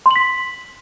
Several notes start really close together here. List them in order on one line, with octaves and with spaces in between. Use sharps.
C6 F#7 B6